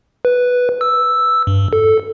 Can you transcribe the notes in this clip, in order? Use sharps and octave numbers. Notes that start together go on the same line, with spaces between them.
B4
E6
G2
A4